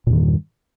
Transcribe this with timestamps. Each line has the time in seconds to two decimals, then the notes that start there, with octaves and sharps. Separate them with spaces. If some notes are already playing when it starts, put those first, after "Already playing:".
0.07 A#2
0.10 E2
0.13 D#3
0.16 G2